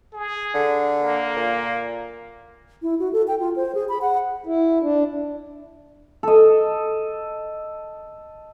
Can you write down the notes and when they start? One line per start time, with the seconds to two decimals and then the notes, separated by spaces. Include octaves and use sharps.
0.13 G#4
0.54 D3
1.01 A#3
1.37 A#2
2.82 E4
2.99 F#4
3.13 A4
3.28 G5
3.40 F4
3.56 C5
3.75 G#4
3.89 B5
4.01 F#5
4.46 E4
4.82 D4
6.23 A4 D#5